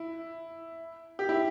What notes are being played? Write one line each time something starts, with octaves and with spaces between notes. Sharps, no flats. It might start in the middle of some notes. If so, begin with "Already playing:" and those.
Already playing: E4
G4
E4